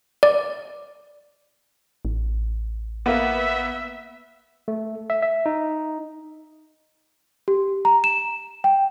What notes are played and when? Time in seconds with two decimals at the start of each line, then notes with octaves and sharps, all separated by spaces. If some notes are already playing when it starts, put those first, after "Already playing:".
0.23 D5
2.05 A1
3.06 A#3 B3 E5
4.68 A3
5.10 E5
5.22 E5
5.46 D#4
7.48 G4
7.85 A#5
8.04 E7
8.64 G5